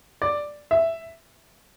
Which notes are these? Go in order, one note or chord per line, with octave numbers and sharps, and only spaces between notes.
D5
E5